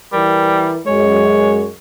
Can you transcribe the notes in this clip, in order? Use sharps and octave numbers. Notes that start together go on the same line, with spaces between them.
E3 G3 A#4
F#2 G#3 C#5